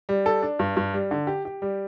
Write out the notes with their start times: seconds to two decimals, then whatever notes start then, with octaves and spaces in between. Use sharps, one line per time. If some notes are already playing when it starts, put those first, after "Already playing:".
0.09 G3
0.26 A4
0.42 D4
0.59 G2
0.77 G2
0.94 G3
1.11 D3
1.27 G4
1.45 G4
1.62 G3